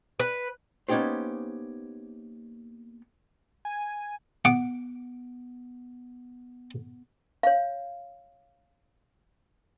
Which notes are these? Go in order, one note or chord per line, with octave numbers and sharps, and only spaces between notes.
B4
A#3 B3 C#4 D#4 G4 C5
G#5
B3 F#5 D6
C#5 F5